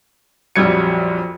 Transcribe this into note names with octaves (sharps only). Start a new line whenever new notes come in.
A#1 F2 F#3 G3 G#6 C#7